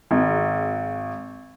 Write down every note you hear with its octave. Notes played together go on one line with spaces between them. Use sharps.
G#1